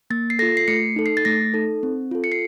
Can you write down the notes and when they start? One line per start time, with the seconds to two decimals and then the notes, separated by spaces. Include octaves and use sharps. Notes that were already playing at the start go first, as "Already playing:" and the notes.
0.10 A#3 A6
0.30 C7
0.39 F4 A4 A#6
0.57 C7
0.68 A3 C#7
0.96 D#4 A4
1.06 C7
1.17 A6
1.25 A3 A#6
1.54 D#4 A4
1.83 C4
2.11 F4 A4
2.24 C#7
2.32 C7